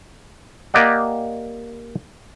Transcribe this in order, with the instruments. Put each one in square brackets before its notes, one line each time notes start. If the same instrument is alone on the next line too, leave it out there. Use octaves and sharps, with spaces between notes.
[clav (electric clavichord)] A#3 G4 D5 D#5 F#5